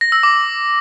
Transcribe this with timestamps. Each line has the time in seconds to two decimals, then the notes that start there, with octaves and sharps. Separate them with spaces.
0.01 A#6
0.12 E6
0.23 D6